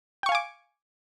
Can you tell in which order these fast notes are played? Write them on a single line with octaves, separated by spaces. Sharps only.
G5 C#6 F5 G#5 D6